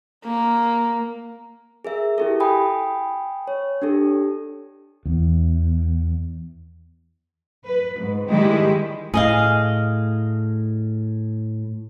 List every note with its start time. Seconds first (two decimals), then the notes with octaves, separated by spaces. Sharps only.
0.25 A#3
1.85 G#4 A#4 E5
2.18 E4 G4 A4
2.40 G5 G#5 B5 D#6
3.48 C#5
3.82 D4 G4 A4
5.06 E2
7.66 B4
7.99 G#2
8.29 D#3 G3 G#3 E4 G4
9.14 A2 G#4 D#5 F5